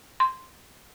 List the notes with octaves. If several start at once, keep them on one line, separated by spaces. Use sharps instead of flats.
C6